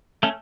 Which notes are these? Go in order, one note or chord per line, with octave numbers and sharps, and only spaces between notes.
A3 C#4